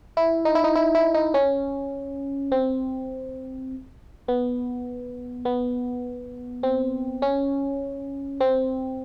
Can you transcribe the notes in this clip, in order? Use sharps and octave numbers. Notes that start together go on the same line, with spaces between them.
E4
D#4
E4
D#4
E4
E4
D#4
C#4
C4
B3
B3
C4
C#4
C4